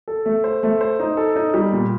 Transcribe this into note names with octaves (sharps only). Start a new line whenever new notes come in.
A4
A3
C5
A3
C5
D#4
A4
D#4
G3
A#2